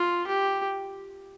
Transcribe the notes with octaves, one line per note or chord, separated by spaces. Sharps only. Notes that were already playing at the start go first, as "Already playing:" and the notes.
Already playing: F4
G4